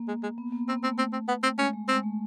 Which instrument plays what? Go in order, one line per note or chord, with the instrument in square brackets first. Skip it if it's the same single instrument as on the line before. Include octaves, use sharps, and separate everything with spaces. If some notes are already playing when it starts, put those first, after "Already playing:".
Already playing: [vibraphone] A#3
[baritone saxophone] G#3
G#3
[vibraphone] B3
A#3
[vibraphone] A#3 [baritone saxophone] C4
[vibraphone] A3 [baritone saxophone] C4
[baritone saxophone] C4
C4
B3
C4
[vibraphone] G#3 [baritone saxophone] C#4
[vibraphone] G#3
[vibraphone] G#3 [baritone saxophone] C4
[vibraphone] A3